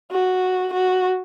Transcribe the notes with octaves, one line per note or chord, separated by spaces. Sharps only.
F#4
F#4